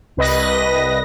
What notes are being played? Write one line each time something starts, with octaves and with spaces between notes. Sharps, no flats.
C2 B4 D#5 A#6